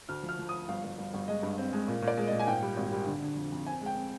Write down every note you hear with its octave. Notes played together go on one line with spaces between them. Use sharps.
D2 F6
F3
F6
F3
D#6
F3
G1 F5
G1
G1
G1
G#3 D#5
G2
C4
G#3
A#2
A#2
D5
G#3
D#5
A#2
G#5
G#2 G5
G3
G#1
G3
D3
D3
F2
F2
C4 G#5
G#3 G5
C4